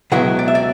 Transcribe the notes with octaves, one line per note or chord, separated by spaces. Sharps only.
C#2 B2 F#3 B3 E4 F#5
D5
E5
D5